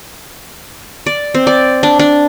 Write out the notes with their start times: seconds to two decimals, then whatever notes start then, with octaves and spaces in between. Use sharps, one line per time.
1.06 D5
1.34 C4
1.47 D5
1.83 D4
1.99 D4